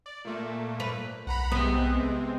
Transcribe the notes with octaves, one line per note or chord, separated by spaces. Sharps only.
D5
A#2 A3 A#3
B4
B1 F#5 A#5 B5
C3 G#3 B3 C4